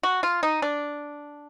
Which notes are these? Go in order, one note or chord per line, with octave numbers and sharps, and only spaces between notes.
F#4
F4
D#4
D4